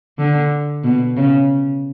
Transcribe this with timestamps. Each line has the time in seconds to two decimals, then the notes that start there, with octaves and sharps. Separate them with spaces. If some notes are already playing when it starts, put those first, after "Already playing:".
0.19 D3
0.84 B2
1.17 C#3